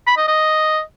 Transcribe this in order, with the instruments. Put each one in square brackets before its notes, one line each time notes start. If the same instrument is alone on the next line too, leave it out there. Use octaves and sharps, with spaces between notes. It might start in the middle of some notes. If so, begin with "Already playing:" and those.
[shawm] B5
D#5
D#5